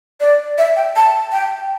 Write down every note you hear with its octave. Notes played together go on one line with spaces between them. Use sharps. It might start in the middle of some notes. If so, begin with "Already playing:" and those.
D5
E5
G5
A5
G5